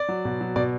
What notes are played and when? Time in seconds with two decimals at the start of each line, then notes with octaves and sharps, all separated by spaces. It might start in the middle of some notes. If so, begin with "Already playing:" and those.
Already playing: D5
0.09 F#3
0.25 B2
0.41 F#3
0.56 B2 D5